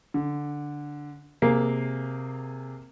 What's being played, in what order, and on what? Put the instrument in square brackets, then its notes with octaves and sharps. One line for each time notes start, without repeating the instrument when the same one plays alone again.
[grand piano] D3
[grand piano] C3 G#4 C7 [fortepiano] A#3